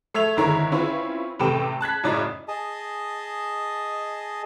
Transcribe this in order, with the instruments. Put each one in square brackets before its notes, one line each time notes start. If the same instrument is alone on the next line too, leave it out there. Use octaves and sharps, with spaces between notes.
[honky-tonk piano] A3 E5 G#6 F7
G#1 D3 E4 A#4 C#5 A#5
C4 C#4 E4 F4 B4
A1 C3 A3 B4 G5 E7
A5 F#6 G#6 B6
F#2 A2 C#3 E4 D5 D#5
[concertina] G#4 D#5 A5